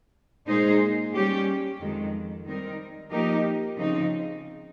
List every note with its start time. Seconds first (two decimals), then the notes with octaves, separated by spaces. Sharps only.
0.47 A#2 G#3 D#4 G#4 C5
1.14 G3 C#4 G4
1.80 F2 D#3 G#3
2.45 D#3 G3 C4 D#4 A#4
3.11 F3 A#3 D#4 G4 A#4
3.77 C#3 F3 C4 D#4